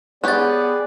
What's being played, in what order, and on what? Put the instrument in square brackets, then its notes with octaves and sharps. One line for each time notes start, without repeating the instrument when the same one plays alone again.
[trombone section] B3 [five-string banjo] G4 C#5 [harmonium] G#4 D5 [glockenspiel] F#6 A6